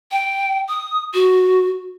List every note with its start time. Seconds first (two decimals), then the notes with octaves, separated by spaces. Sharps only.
0.12 G5
0.69 D#6
1.14 F#4